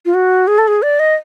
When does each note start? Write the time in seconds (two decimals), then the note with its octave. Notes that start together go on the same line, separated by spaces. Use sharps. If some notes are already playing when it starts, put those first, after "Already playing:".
0.06 F4
0.14 F#4
0.47 G#4
0.58 A4
0.68 G#4
0.82 D5
0.99 D#5